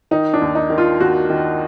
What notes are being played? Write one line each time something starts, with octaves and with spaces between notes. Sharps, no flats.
D#3 D#4
D4
D#2
D#4
D#3
F4
D#2 F#4
D#3